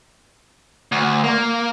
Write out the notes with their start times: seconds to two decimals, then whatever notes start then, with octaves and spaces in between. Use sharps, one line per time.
0.92 D2
1.24 A#3